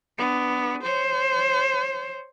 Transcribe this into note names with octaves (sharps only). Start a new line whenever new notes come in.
B3 D4
C5 C#5